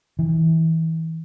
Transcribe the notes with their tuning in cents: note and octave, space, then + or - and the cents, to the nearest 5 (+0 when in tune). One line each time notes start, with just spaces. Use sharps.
E3 -30